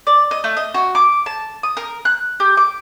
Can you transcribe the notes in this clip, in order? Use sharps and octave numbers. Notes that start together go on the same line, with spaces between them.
D5
D#5
A3
D#5
F#4
D6
A5
D#6
A#4
F#6
G4
D6